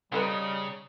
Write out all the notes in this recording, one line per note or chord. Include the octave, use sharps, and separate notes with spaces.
C#3 G3 C4 D#4 A4 B4